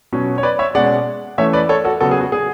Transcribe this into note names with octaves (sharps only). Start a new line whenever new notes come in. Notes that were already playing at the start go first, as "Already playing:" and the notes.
B2 F#3 C#4
C#5
B4 D5
C#5 E5
B2 G#3 C#4 D5 F#5
E3 A3 C#4 C#5 E5
B4 D5
A4 C#5
F#4 A4
C#3 F#3 B3 F#4 A4
G#4
F#4
G#4